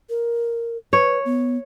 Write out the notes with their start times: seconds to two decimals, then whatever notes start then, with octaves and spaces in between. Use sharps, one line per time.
0.10 A#4
0.93 B4 C#5
1.25 B3